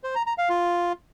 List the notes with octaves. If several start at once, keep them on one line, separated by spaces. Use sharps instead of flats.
C5
A#5
A#5
F5
F4